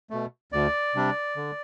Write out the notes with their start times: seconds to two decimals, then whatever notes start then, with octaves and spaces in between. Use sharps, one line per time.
0.10 B2 A3
0.52 D2 D5
0.95 C3 G3 D4
1.37 D3